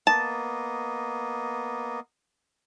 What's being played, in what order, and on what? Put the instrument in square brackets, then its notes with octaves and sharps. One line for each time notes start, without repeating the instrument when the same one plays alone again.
[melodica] A#3 B3 D#5 [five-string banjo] A5